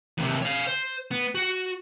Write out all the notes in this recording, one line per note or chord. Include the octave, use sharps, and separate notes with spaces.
D#2 C3
C#5 F5
C5
B3
F#4